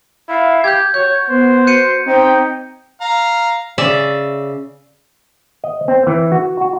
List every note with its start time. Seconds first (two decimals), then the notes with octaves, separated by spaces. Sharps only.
0.29 E4 F5
0.64 G4 G6 G#6
0.94 F#4 C#5 G6
1.29 B3 C5
1.67 G6 C#7 D#7
2.07 C4 D#4 G5
3.01 F5 A#5
3.78 C#3 D5 E5
5.64 D#5
5.88 C4
6.07 E3
6.32 F#4
6.61 F#4